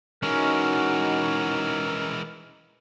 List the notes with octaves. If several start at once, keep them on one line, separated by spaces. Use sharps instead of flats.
E3 G#3 C#4 D#4 F#4 A#4